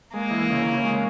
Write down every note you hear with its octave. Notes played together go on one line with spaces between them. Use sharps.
G#3 A#3
E3
C#3
C#3
G#3